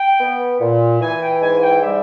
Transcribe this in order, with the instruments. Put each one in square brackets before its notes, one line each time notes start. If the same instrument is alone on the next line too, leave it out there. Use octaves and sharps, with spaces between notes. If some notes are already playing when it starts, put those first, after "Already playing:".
Already playing: [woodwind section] G5
B3
A#2
E3 G#5
G5
G#2 G#5
G5
G3 E5